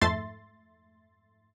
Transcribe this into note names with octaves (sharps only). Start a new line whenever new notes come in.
F2 G#2 A3 E5 C6 A6